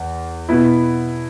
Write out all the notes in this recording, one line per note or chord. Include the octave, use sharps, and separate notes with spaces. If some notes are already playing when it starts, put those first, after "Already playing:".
Already playing: E2
B2 B3 E4